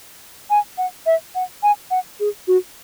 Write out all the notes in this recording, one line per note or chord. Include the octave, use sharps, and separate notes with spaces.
G#5
F#5
E5
F#5
G#5
F#5
G#4
F#4